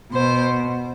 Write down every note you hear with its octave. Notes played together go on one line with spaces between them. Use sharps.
B2 C5